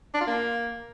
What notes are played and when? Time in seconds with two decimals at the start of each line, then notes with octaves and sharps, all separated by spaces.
0.14 D4
0.21 F4
0.27 A#3